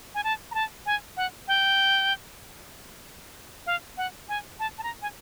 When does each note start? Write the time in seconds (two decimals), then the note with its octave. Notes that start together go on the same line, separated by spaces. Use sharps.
0.14 G#5
0.24 A5
0.51 A#5
0.55 A5
0.86 G#5
1.17 F#5
1.48 G5
3.66 F5
3.97 F#5
4.29 G#5
4.60 A5
4.78 A5
4.83 A#5
5.02 G#5